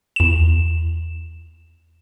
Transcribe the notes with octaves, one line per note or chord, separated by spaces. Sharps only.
E2 E7